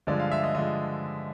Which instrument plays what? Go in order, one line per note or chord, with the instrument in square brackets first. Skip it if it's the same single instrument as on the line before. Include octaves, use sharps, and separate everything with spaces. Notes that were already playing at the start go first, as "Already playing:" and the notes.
[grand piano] G2 D3 F3 G#3 D5
F5
E5
D#5
D3 F3 G#3 D#5